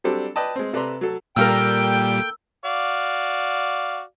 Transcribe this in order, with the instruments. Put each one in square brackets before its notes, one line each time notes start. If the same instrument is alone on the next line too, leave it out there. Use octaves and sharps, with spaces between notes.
[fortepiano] F#3 G3 C4 D4 A4
B4 D5 D#5 G5 A5
G#3 C4
C3 A4 B4 D5 A#5 C6
F#3 A4
[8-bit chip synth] A#2 G3 [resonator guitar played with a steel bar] A#3 A4 A#4 [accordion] G5 [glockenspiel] E6
[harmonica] F#4 D5 F5